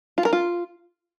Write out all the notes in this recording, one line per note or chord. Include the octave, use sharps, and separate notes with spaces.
F4
A#4
F4